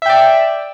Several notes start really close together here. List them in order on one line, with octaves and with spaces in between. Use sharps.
E5 G5 D5